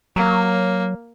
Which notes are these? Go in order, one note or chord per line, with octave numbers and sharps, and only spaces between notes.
F#3 A#3